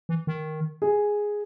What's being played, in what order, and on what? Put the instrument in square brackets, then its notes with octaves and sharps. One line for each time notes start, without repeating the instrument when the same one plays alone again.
[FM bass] E3
D#3
[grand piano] G#4